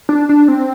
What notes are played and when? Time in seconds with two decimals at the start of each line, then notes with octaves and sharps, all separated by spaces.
0.09 D4
0.29 D4
0.48 C4